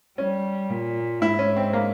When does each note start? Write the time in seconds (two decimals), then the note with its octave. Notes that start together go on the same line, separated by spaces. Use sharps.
0.18 G3 C#4
0.70 A#2
1.22 G#2 E4
1.39 C#4
1.57 C4
1.73 A#3